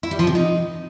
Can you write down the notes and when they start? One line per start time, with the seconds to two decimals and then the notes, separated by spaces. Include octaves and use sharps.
0.03 E4
0.11 G3
0.19 F3
0.27 C3
0.35 D#4